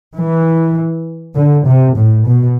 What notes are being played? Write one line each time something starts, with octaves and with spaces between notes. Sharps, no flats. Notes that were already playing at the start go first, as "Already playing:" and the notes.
E3
D3
C3
A2
B2